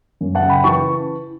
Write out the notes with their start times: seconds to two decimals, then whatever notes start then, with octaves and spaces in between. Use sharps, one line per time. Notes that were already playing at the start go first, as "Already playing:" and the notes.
0.21 F#2
0.35 F#5 A5
0.42 C#3
0.50 G5 B5
0.64 E3 A5 C#6